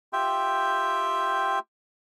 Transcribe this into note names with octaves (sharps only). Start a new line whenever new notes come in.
F4 G4 E5 G5